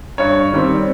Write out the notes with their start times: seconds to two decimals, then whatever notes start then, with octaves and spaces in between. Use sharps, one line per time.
0.18 G2 C#5
0.52 D#3 G3 C4